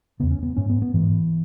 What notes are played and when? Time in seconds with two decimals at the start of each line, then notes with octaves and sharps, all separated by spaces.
0.20 E2 C#3 B3
0.31 C#4
0.43 B3
0.57 G#2 C#4
0.70 B3
0.82 B3
0.94 G#2 E3